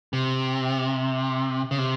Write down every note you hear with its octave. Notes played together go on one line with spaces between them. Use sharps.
C3
C#3
C3